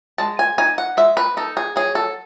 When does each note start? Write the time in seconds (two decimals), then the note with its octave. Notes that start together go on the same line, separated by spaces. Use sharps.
0.18 G#3 A5
0.39 G#5
0.58 D#4 G#5
0.78 F#5
0.97 G#3 E5
1.17 B4
1.37 D#4 A4
1.57 G#4
1.76 F#3 G#4
1.95 A4